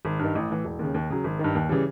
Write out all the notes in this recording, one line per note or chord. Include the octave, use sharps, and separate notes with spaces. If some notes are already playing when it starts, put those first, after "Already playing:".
G#1
G2 D#3
A1
A2 E3
E1
D#2 C#3
D#2
C#3 F#3
G#1
G2 D#3
D#2
C#3 E3 G3